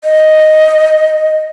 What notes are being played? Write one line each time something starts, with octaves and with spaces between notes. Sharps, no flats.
D#5